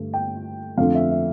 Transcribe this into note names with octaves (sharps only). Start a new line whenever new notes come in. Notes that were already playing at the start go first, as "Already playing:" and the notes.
Already playing: G2 D3 A3
G5
F2 D3 A3 C4 F5
E5
E5